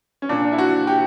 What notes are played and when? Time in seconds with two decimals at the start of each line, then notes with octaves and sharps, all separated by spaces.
0.22 C#4
0.29 A#2 D4
0.52 E4
0.58 F#4
0.87 G4